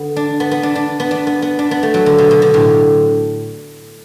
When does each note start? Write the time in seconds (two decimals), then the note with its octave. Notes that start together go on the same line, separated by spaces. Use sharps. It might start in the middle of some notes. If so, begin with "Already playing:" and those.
Already playing: D3 B3
0.16 D4
0.40 B3
0.51 B3
0.63 D4
0.75 D4
1.00 B3
1.11 D4
1.27 B3
1.42 B3
1.59 D4
1.71 B3
1.83 A3
1.94 F#3
2.06 D3
2.18 B2
2.31 B2
2.42 D3
2.54 A2